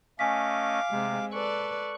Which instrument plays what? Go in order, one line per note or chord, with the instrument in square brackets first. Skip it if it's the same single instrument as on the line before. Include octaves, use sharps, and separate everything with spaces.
[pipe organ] A3 C#4 D#5 [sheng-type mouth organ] F5 D6 [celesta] G#5 B6
[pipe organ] C3 [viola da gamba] G#3 C4
[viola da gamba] A4 B4 D5 [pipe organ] C#6 F#6